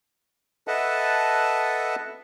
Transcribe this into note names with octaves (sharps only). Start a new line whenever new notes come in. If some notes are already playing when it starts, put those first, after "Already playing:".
A4 B4 D#5 E5 F#5 A5